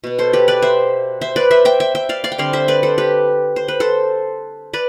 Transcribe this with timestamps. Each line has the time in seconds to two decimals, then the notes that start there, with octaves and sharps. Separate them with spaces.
0.04 B2 B3
0.19 A4 C5
0.33 G4 B4
0.48 B4 D5
0.62 C5 E5
1.21 C5 E5
1.36 B4 D5
1.51 C5 E5
1.65 E5 G5
1.80 E5 G5
1.95 E5 G5
2.09 D5 F5
2.24 D5 F5
2.32 G5
2.38 D3 G3 C4 D5 F5
2.53 C5 E5
2.68 B4 D5
2.83 A4 C5
2.98 G4 B4
3.56 C5
3.68 B4
3.80 A4 C5
4.73 B4 D5